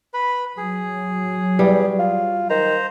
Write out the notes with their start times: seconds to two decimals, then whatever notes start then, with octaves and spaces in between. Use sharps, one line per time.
0.14 B4 B5
0.57 F#3 G#4
1.59 E2 G3
1.99 F4
2.50 D#3 C5 A#5